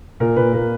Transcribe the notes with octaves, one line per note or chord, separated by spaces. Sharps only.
A#2 A#4
A#2 B4
A#2 A#4